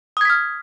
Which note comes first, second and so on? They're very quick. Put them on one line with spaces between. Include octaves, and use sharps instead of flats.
D#6 G#6 B6 F6